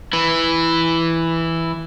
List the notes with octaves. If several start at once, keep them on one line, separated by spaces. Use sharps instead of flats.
E3 E4